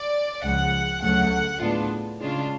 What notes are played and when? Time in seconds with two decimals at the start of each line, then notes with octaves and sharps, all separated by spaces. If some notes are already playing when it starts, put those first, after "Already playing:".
Already playing: D5
0.44 C#2 C#3 F3 G#3 F#5
1.02 D2 C#3 F#3 A3 F#5
1.61 A2 G#3 B3 D4 F4
2.21 C#3 G#3 D4 F4